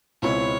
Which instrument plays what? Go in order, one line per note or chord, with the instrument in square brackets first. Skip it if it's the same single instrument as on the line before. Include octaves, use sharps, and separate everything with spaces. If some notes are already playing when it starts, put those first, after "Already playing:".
[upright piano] C#2 B2 G#3 C4 E4 [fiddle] C#5